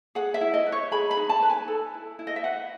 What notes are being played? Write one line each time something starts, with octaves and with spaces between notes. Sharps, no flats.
G#4 F#5
E5
E4
D#5
B4
C#5
G#4 B5
B5
D#4
A5
B4
G#5
A4
E4
E4
D#5
E5
B4 F#5